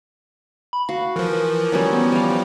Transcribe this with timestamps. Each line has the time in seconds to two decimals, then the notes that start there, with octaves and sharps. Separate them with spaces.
0.73 B5
0.89 F#4 F5
1.16 E3 F3 A#4
1.72 F#3 G3 C#4
1.93 B3
2.12 G3 F5